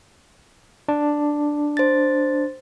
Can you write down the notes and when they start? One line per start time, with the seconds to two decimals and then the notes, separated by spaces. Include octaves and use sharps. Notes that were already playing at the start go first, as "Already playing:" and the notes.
0.88 D4
1.77 C5 A6